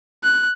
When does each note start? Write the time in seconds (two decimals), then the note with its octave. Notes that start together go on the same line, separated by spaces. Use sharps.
0.23 F#6